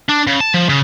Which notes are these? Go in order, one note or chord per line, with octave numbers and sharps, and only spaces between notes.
D4
C#3
A5
F3
C#3